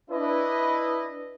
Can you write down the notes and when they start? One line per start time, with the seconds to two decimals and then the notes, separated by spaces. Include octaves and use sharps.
0.10 D4 E4 B4 D#5